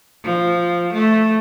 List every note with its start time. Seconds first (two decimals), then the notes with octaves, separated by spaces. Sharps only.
0.23 F3
0.93 A3